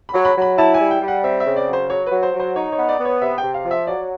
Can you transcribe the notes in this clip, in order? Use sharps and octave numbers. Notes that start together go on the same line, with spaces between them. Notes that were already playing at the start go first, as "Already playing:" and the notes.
B5
F#3
B5
F#3 B5
E4 A5
G#5
G3
G5
G3
F#5
C4 E5
E5
C#3
D5
F#3
C5
F#3 C#5
B4
F#3
C5
F#3
C5
D#4 C#5
C#5
B3
D5
B3
C#5
C3 E5
G5
C3
F5
F3
E5
F#3 D5